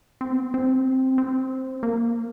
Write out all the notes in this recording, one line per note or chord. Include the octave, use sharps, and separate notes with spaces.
C4
B3
C4
C4
A#3